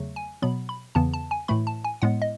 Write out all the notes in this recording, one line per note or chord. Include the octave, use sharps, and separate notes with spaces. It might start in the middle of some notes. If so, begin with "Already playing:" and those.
Already playing: E2 C#3 F#3 A3
G#5
B2 F#3 B3 B5
B5
E2 C#3 E3 B3 A5
A5
G#5
A2 E3 A3 B5
A5
G#5
A2 G#3 B3 F#5
D#5